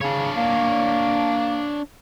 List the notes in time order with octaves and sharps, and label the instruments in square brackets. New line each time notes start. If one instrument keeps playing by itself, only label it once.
[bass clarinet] C#3 [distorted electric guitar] D4 C#5
[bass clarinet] A#3